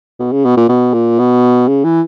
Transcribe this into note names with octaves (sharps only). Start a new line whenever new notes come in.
B2
C#3
B2
A#2
B2
A#2
B2
C#3
E3